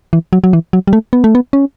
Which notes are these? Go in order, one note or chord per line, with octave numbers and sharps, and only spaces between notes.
E3
F#3
F#3
E3
F#3
G3
A3
B3
A3
B3
C#4